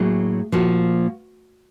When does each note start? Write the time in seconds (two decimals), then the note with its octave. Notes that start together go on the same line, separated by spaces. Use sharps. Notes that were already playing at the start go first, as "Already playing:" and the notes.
Already playing: A2 F#3 A#3 G#4
0.52 A#2 F3 A#3 F#4